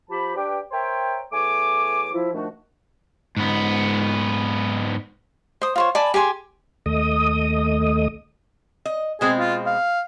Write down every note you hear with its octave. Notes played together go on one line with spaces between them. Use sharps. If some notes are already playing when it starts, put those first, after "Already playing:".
F3 G4 A5 B5
D4 G4 B4 G5
A#4 C5 C#5 E5 G5
E2 A3 C#5 G#5 D6
F3 E4
A#2 D#3 F3 A3 D4 F#4
G#2 B3
C5 D#6
F4 C5 C#5
D5 G#5 A5 B5
G4 G#4 G#5 C6
D#2 A3 D#5 D#6
D#5
B2 G#3 C4 G#4
F4
F5